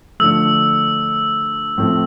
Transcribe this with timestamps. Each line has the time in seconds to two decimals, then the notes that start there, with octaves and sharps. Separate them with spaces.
0.20 D3 F3 A3 E6
1.78 A2 F3 A3 C4